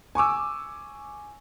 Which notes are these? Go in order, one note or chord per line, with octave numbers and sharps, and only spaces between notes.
G#5 C#6 D6 E6